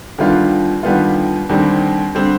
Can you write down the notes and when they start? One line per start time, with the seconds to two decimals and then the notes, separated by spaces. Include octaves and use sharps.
0.18 D#2 D3 G3 B3 F4
0.83 D#2 D3 G3 B3 F4
1.49 D#2 D3 G3 C4
2.15 D3 G3 C4